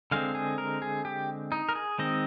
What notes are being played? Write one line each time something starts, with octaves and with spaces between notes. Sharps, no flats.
D3 G#3 C4 F5
G#4
A#4
G#4
G4
D#4
A#4
G#4
D#3 G#3 C4 D#5